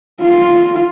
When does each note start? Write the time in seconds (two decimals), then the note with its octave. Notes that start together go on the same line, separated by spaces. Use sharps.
0.22 F4